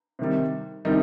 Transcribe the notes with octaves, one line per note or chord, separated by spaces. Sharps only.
C3 D#3 G3
C3 D#3 G3 D#4